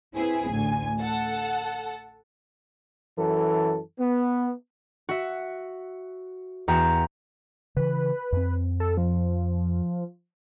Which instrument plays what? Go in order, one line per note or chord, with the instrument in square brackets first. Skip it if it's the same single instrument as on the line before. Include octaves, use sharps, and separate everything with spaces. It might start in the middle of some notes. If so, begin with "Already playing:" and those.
[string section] C4 E4 G#4 B4
A1 D2 G#5
A4 F#5 A5
[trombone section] F#2 E3 A4
B3
[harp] F#4 E5
E2 F#4 G5 A#5 G6 E7
[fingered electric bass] C#3 E3 [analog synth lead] B4
[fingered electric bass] F2 C4
[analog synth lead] A4
F3